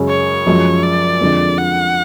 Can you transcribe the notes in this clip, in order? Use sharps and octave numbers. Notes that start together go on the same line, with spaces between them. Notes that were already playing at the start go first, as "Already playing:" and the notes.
Already playing: F#2 C#3 G#3 C#4
C#5
F#2 F3 G#3
D5
F2 D3 F3 G#3
F#5